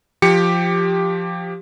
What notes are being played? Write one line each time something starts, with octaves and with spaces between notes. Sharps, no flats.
F3 G4 C#7